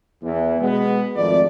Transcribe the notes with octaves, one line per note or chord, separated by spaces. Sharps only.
E2 E3
B2 G#3 B3
G#1 F2 A3 D5